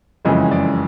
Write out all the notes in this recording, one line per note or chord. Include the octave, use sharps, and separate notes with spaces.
F#1 F2 C#3 E3 G#3 D#5
D5